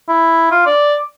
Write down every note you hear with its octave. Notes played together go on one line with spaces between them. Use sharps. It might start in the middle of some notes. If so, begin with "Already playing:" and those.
E4
F4
D5